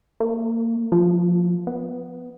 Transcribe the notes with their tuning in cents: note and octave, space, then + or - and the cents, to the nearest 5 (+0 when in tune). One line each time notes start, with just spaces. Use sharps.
A#3 -25
F3 +15
B3 +5